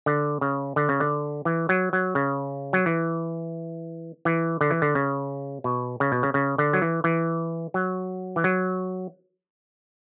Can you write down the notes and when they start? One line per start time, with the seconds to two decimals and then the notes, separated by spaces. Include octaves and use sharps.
0.06 D3
0.41 C#3
0.76 D3
0.89 C#3
1.00 D3
1.45 E3
1.69 F#3
1.93 F#3
2.15 C#3
2.73 F#3
2.86 E3
4.25 E3
4.61 D3
4.70 E3
4.82 D3
4.95 C#3
5.64 B2
6.00 C#3
6.12 B2
6.23 C#3
6.34 C#3
6.58 D3
6.73 F#3
6.82 E3
7.04 E3
7.74 F#3
8.36 E3
8.44 F#3